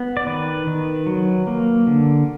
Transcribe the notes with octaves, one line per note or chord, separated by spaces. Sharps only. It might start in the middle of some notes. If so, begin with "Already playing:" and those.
Already playing: B3
D5
D#3 B4
D#3
F#3
A#3
D3